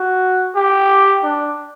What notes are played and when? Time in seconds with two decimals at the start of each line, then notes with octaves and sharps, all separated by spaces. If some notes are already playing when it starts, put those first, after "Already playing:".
Already playing: F#4
0.55 G4
1.23 D4